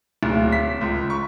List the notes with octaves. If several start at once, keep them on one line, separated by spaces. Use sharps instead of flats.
D1
B6
C#2
C#6